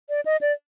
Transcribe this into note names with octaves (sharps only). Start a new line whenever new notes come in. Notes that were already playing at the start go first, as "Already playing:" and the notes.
D5
D#5
D5